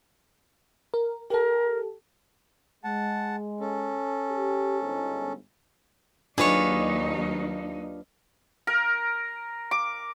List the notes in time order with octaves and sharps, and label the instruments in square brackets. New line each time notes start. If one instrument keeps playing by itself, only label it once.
[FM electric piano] A#4
[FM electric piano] G4 A4 [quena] A#4
[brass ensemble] G#3 [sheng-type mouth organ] F#5 A5
[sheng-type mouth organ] C#4 A4
[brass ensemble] G4
G1 G#2
[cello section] D#2 F#3 D#4 [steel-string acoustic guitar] D4 F4 B4 [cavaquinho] G#4 C#5
[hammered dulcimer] A#4
D6